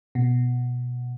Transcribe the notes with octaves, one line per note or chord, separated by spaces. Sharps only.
B2